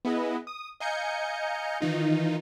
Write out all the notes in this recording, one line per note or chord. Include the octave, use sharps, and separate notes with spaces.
B3 E4 G#4 B4 D#5
D#6
D#5 F5 G#5 A#5 G6 C#7
D#3 E3 D#4 F4